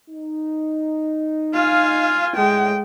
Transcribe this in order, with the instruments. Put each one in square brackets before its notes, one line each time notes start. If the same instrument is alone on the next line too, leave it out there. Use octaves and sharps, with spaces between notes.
[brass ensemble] D#4
[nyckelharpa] F4 G#5 [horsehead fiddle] F5
[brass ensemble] A2 [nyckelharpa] G#3 [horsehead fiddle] G5